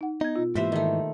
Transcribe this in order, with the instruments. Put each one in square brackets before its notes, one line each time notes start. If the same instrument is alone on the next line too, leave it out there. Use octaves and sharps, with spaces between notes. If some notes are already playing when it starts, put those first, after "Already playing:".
[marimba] D#4 F#5
[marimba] B3 G#6 [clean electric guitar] D#4
[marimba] B2 F4
[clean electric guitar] G#2 E3 [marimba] A#3 G4 [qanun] C5 E5
[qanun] D#3 A3